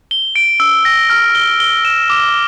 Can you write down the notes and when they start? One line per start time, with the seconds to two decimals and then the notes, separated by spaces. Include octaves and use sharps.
0.11 G7
0.36 D7
0.60 E6
0.85 A#6
1.10 F6
1.35 G7
1.60 G7
1.85 E7
2.10 D6